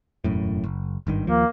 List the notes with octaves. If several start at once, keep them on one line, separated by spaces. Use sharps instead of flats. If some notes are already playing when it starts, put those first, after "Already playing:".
E1 F#2 A2
F#1
G#1 G2 D#3
D#2 F3 A#3